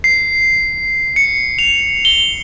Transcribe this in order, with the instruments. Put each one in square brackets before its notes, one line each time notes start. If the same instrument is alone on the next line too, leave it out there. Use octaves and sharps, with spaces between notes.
[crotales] C7
C#7
F7
G7